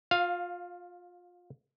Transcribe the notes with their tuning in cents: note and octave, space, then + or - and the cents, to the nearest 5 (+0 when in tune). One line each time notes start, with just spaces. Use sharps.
F4 +25 F5 +0